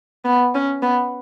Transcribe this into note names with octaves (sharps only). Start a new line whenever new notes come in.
B3
C#4
B3